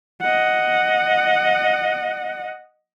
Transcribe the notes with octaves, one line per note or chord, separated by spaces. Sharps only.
D#5 F#5